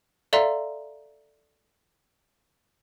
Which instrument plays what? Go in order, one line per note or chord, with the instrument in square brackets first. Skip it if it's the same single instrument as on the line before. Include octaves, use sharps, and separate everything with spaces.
[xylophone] A4 D5 E5 F5 A#5 C6